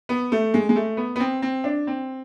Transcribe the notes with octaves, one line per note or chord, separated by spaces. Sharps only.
B3
A3
G#3
G#3
A3
B3
B3
C4
C4
D4
C4